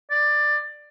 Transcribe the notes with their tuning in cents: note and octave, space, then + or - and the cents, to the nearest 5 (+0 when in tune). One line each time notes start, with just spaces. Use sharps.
D5 +15